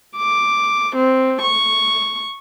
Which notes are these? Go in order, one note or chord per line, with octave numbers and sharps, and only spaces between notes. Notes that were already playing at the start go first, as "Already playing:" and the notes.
D6
C4
C#6